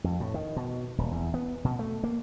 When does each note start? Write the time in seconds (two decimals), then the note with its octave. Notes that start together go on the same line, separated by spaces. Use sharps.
0.04 F2
0.20 A2
0.34 D#3
0.56 B2
0.98 D#1
1.12 E2
1.34 B3
1.64 B2
1.79 A3
2.03 A#3